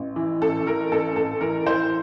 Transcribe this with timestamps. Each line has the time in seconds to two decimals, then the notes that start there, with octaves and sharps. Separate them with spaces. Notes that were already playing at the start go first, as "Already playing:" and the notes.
Already playing: A1
0.16 E3
0.41 A1 A4
0.66 E3 A#4
0.92 A1 A4
1.16 A1 A4
1.41 E3 A#4
1.66 E3 C5